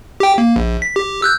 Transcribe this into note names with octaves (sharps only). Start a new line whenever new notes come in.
G4 G5
A#3
A#1
B6
G4
E6 F#6 G6